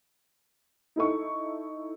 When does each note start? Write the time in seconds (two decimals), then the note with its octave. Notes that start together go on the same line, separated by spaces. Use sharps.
0.96 D#4 E4 A4 C#6